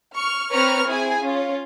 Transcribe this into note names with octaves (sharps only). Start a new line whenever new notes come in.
C#6 F6
C4 B4 C#5 A#5 C#6 F6
C4 E4 G#4 G#5
C#4 F4